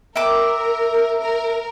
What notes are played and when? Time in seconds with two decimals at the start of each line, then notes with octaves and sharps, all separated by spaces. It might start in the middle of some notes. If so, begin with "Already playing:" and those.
0.16 A#4 E5 G5 D6
1.20 A#4